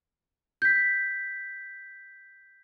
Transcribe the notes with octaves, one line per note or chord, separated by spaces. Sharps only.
G6 B6